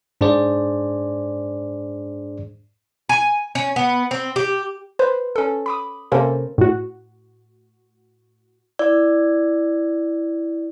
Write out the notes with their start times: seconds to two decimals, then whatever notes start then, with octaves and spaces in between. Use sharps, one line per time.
0.21 G#2 D4 G#4 C5 D5
3.09 G#5
3.55 C#4
3.76 B3
4.11 C4
4.36 G4
4.99 B4 C5
5.36 C#4 A4
5.66 B5 D6 D#6
6.12 C3 A#3 C#4 A4 A#4 C5
6.58 A2 F#4
8.79 E4 D5